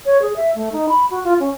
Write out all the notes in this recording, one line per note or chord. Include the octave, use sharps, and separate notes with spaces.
C#5
G#4
E5
A3
D#4
B5
F#4
F4
C#4